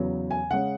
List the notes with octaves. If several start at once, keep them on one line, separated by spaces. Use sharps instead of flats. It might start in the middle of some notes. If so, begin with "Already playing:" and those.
Already playing: E2 C#3 F#3 B3
G#5
C#3 G#3 C#4 F#5